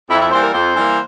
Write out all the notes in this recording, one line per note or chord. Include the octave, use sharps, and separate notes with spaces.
F2 E4
E4
E3 G3 A#3 C5
A#4
F2 C5
E3 G3 A#3